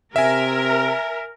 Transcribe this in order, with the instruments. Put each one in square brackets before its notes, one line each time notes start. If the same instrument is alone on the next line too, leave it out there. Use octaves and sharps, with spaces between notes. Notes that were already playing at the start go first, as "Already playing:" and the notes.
[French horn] C3 [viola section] A#4 [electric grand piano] E5 G#5